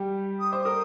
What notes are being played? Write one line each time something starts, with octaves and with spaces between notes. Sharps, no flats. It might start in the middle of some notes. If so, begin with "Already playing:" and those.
Already playing: G3 G4
D#6
C5 D6
A#4 D#6